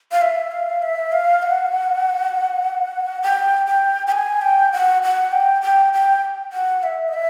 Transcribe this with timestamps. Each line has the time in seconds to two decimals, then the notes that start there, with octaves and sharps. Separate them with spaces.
0.12 F5
0.22 E5
0.52 F5
0.82 E5
1.12 F5
1.42 F#5
3.22 G5
3.67 G5
4.07 G5
4.12 G#5
4.42 G5
4.72 F#5
5.03 F#5
5.32 G5
5.62 G5
5.93 G5
6.53 F#5
6.83 E5
7.08 D#5
7.13 E5